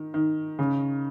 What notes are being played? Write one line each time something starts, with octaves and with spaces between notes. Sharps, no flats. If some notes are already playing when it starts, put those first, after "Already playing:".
Already playing: D#3
D#3
C#3